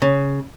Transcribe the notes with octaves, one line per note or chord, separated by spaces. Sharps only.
C#3